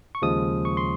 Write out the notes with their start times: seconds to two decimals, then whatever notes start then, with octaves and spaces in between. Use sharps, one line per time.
0.15 C#6
0.22 D#2 C#3 F3 G#3 D#6
0.65 C#6
0.77 C6